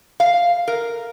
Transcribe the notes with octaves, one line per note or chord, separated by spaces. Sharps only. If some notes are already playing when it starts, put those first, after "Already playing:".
F5
A#4